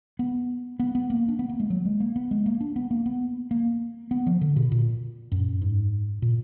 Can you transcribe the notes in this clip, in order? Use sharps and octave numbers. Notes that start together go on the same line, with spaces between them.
B3
B3
B3
A#3
D4
B3
A#3
G#3
F#3
G#3
A#3
B3
G#3
A#3
D4
B3
A#3
B3
A#3
B3
F3
D3
B2
A#2
F#2
G#2
A#2